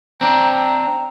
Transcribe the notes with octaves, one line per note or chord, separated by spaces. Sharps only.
C4 D4 A#5